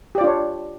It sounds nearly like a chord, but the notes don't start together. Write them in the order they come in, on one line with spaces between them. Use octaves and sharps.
G4 D5 F4 D4 C#5